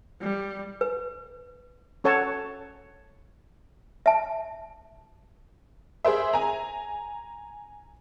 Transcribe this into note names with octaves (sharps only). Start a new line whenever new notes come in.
G3
B4
C#4 A4 C#5 F#5 A5
E5 A5
G#4 A#4 C5 E5
G#5 A#5